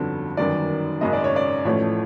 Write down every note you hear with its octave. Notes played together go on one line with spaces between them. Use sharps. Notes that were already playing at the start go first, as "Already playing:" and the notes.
Already playing: G1 F2 D3 F#3 A4
G1 F#2 D#3 F#3 D5
G#1 F#2 C#3 D#5
D5
C#5
D5
A1 A2 F3 A3 C#5